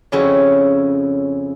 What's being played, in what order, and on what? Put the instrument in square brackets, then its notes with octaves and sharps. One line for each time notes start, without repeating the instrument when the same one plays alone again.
[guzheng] F2 C#3 C#4 E4 F#4